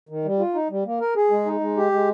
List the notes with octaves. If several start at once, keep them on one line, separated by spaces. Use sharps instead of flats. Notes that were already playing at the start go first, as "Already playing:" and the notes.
D#3
G3
F4
D#4
G3
A#3
A#4
G#4
G#3
D#4
G#3
G4
G#3